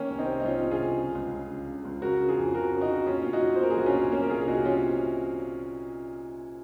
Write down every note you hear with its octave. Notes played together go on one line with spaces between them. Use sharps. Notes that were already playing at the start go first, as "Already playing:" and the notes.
Already playing: D#3 A#3 C#4
C2
C4 D#4
C3
D#4
C2 C#4 F4
C3
F4 G#4
C2
C#3
C#2
C#3
C#3
C#3
C#2
C#3 F#4 A#4
C#3
F4 G#4
F2
C#3 F#4 A#4
C#3
D#4 F#4
C#3
A#2 C#4 F4
A#2 F4
D#4 F#4
A#2
C5
A#2 A#4
G#4
C2 F#4
C#4 F4
A#2
C3 A#3 C#4
A#4
C2 F4 G#4
G#4
C3 D#4 F#4
C3 C#4 F4
C3